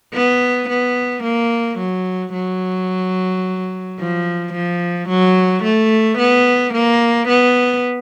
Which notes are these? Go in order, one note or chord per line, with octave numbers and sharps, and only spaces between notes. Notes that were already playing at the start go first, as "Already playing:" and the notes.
B3
B3
A#3
F#3
F#3
F3
F3
F#3
A3
B3
A#3
B3